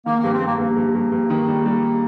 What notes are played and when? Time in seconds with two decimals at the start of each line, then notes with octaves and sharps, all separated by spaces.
0.06 D#3 A#3
0.19 A#3
0.24 G2
0.32 C4
0.41 G2 A#3
0.59 G2 A#3
0.77 G2
0.95 G2
1.12 G2
1.30 D#3
1.47 G3
1.66 G3